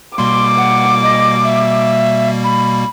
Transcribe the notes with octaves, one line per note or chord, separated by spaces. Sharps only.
B2 G3 A#3 C6 D6
F#5
D#5
E5
B5